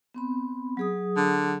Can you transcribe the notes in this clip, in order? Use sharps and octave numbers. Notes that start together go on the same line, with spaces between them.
B3 C4 B5
F#3 G#4 D#6
D3